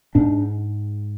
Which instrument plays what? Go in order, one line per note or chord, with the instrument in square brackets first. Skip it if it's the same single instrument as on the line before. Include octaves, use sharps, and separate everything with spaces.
[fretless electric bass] G#2 D4